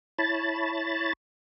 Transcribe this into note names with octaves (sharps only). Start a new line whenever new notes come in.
E4 C#5 A5 B5 A6